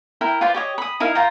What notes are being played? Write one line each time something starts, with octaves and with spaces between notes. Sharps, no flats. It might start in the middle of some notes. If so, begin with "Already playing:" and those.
E4 A#4 G5
F4 B4 C5 D5
G4 C#5 D#5
B5 D#6
D#4 E4 A#4 F5
F4 G5 A#5